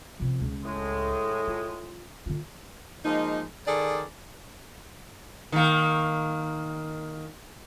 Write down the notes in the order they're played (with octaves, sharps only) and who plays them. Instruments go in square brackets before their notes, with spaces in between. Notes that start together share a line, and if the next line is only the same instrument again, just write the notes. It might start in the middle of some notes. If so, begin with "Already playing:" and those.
[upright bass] C3 F3
C#2
[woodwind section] A2 G#3
[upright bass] F4
D3 F4
[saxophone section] F3 G#3 A#3 D#4
D#3 G#4 A4 D5
[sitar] D#3 A#3